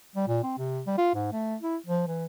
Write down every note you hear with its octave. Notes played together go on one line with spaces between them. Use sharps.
G3
A#2
C4
C3
G3
F4
G#2
A3
E4
F3
E3